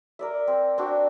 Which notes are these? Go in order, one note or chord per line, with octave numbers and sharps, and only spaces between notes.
A#4 D5 E5
C4
C4 D4 F#4